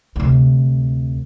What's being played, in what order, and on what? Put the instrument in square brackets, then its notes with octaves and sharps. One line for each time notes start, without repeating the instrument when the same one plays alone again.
[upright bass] D2 C3